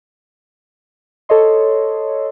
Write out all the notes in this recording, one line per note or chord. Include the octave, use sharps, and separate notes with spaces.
A4 C#5 D#5 C6